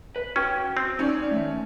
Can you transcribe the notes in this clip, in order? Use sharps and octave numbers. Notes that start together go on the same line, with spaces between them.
B4
C#4 F#4 G5
C4
C#4 D#4 C#5 D5
D#3 F3 A3